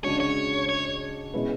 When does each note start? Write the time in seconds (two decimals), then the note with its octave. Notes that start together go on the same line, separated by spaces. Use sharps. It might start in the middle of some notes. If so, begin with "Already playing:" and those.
0.04 C#3 G#3 D4 F#4 C#5
0.20 C#5
0.69 C#5
1.34 B2 G#3 C#4 E4 B4